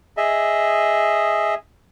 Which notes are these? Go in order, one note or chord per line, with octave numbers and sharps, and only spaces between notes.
G#4 D#5 E5